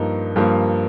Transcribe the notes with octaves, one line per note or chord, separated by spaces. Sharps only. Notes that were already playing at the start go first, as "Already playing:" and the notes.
Already playing: G2 F3 A#3 D#4
G2 F3 A#3